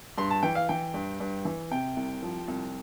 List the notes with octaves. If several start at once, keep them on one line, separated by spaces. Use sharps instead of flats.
G2 C6
A5
E3 G5
F5
E3 G5
G2
G2
E3
C3 G5
C2
F3
C2